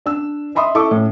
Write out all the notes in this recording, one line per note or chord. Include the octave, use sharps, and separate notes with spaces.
D4 E6
D#5 E5 B5 C6 D#6
E4 A4 E5 C#6 D6
A2 C#4